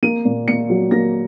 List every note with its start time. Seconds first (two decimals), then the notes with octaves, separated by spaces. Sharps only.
0.02 A#3 D#7
0.25 A#2
0.48 A#2 C#7
0.70 F#3
0.91 A#3 A#6